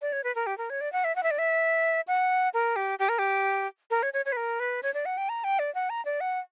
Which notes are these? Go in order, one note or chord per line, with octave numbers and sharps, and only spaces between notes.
D5
C#5
B4
A#4
G4
A#4
C#5
D5
F#5
E5
F#5
E5
D5
E5
F#5
A#4
G4
G4
A#4
G4
A#4
C#5
C#5
C#5
B4
A#4
B4
C#5
D5
F#5
G5
A#5
G5
D5
F#5
A#5
D5
F#5